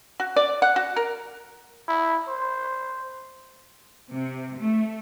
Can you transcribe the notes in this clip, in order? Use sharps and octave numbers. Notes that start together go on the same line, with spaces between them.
F#4
D5
F#5
F#4
A#4
E4
C5
C3
A3